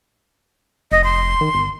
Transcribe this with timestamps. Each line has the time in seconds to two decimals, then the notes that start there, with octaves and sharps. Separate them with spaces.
0.92 F1 D#5
1.04 C6
1.41 D#3
1.55 G1